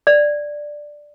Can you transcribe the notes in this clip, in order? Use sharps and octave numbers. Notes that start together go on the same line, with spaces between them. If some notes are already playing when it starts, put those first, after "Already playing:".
D5